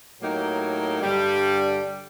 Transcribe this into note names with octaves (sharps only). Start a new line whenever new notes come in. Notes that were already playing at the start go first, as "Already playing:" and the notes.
A2 F#3 A#3 D#4 G4
G2 D3 G3